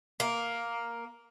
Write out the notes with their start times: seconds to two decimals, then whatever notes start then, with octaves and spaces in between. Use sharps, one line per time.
0.20 A#3